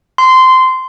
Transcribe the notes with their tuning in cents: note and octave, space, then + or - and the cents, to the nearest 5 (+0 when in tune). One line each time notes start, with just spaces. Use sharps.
C6 -15